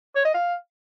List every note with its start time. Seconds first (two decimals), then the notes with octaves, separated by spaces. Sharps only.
0.15 C#5
0.25 D#5
0.34 F5